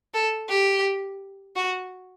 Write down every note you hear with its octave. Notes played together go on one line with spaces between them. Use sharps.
A4
G4
F#4